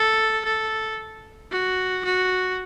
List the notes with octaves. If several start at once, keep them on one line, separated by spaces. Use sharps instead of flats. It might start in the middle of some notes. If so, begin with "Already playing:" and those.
Already playing: A4
A4
F#4
F#4